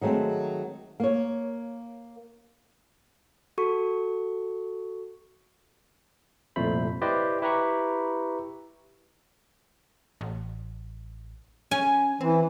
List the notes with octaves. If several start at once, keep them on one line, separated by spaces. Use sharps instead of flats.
D#3 F#3 G#3 A3 C4
A#3 C#5
F#4 A4 C#6
C2 F2 A#2 A3 C5 B5
E4 G4 B4 C5 D5 D#5
E4 G4 B4 A#5 B5 C#6
A1
C#4 G#5
E3 C4